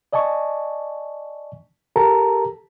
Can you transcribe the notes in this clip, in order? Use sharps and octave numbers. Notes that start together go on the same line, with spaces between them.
D5 D#5 G#5 A5 C#6
G4 A4 A#4 A5 A#5